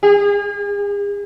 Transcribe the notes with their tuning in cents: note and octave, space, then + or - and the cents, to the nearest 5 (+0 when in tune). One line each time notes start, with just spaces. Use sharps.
G#4 -40